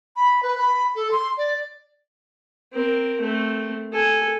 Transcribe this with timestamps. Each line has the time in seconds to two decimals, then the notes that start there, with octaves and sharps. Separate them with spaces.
0.16 B5
0.43 B4
0.58 B5
0.96 A4
1.11 C6
1.38 D5
2.73 C4 A#4
3.21 A3 C4
3.93 A4 G#5